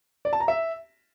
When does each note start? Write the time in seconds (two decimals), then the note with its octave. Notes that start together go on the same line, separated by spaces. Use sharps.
0.25 D5
0.33 A5
0.40 A#5
0.48 E5